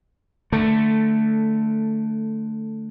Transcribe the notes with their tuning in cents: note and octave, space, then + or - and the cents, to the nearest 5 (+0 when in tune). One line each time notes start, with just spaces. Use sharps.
D3 +5 A3 +0